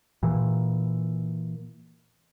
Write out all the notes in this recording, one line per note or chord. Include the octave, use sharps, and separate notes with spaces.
A#2 E3